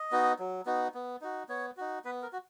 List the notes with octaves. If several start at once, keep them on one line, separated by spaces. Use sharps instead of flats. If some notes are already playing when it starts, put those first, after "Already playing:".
Already playing: D#5
B3 D#4 F#4
F#3
B3 D#4 F#4
B3
D#4 F#4
B3 C#5
D#4 F#4
B3 B4
A#4
F#4